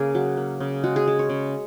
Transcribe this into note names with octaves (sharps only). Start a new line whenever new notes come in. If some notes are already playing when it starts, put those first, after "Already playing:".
Already playing: C#3 A#3 G#4
F#3
A#3
C#3
G#3 F#4
G#4
G#3
C#5
C#3